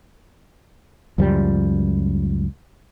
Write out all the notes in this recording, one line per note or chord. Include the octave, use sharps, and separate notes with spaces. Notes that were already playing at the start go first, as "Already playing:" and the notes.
C#2 F#2 F3 G3